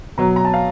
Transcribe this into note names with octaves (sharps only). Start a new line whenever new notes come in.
B2 F#3 A#5
A#5
A5
F5